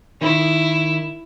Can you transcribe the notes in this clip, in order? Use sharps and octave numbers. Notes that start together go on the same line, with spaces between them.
D#3 E4